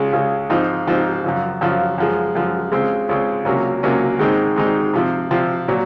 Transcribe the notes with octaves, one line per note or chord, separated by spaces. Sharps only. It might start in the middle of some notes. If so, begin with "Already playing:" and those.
Already playing: C#2 C#3 G#3
C#2 C#3 G#3
G#2 F3 C4 D#4
G#2 F3 C4 D#4
F#2 C#3 F3
F#2 C#3 F3
F#2 F3 G#3
F#2 F3 G#3
C#2 C#3 G#3 C4
C#2 C#3 G#3 C4
C#2 C3 F#3 A#3 C#4
C#2 C3 F#3 A#3 C#4
G#2 D#3 G#3 C4 D#4
G#2 D#3 G#3 C4 D#4
C3 F3 C4
C3 F3 C4
A#2 F#3